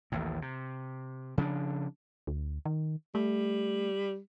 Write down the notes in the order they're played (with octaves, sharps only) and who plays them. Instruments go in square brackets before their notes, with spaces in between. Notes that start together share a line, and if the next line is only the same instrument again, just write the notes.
[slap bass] A1 D#2 A2
C3
C#3 F3 C#4 D4
[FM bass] D2
D#3
[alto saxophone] G3 [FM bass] A3